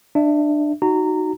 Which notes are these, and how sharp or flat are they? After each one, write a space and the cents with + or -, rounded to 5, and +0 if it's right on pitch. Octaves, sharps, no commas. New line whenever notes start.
D4 +20 E5 +0
D#4 +0 F#4 +10 A#5 -20